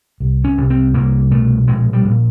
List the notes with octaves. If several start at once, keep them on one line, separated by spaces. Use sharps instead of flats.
C2
C#4
C2
C4
C2 A#3
B2 A3
A#1 G#3
G3
A#2